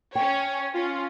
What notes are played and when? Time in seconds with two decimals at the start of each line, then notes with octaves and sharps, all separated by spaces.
0.15 C#4 C#5 G5
0.74 C#4 F4